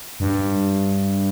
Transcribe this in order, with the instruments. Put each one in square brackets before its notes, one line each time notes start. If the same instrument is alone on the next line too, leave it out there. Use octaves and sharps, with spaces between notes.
[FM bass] G2